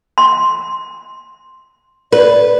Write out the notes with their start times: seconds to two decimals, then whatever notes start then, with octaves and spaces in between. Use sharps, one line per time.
0.18 C6
2.12 B4 D5